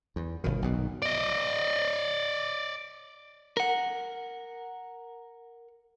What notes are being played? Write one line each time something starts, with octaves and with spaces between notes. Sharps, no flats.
E2
G1 B2 D#3
B1 B2
D5 D#5
A#4 F#5